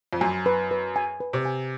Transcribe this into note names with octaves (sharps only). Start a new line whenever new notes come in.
F2
F#2 G#5
B4
B4
G#5
B4
C3
G#5